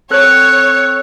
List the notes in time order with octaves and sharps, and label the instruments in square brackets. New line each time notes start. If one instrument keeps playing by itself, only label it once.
[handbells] C4 A4 F#6 [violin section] C#5